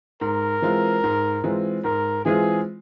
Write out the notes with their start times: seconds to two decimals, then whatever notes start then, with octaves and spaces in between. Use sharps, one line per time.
0.21 G#2 A#4
0.62 E3 G#3 C4 F4
1.04 G#2
1.44 E3 G#3 C4 F4
1.84 G#2 A#4
2.25 E3 G#3 C4 F4 G#4